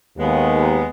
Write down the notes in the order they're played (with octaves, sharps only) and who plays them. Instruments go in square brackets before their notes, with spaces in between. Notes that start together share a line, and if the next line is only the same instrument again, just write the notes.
[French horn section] D#2 [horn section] G#3 B3